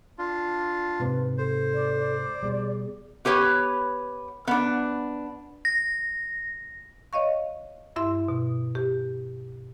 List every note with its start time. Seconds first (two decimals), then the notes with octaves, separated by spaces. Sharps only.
0.19 D4 F4
1.00 G#2 C3 B4
1.38 A4 C5
1.74 D5
1.97 D5
2.43 B2 G3 G#4
3.25 B3 G4 B4 C#5
4.47 B3 D4
5.65 A#6
7.13 C#5 D#5 F5 C#6
7.96 G2 E4 E5 C6
8.28 B2
8.75 G4